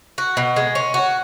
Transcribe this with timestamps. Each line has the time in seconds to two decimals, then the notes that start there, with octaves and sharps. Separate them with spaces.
0.18 F#4
0.37 B2
0.56 G#3
0.75 C#4
0.94 F#4